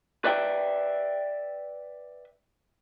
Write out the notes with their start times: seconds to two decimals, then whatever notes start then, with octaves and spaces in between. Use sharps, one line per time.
0.24 B4 D5 E5 G5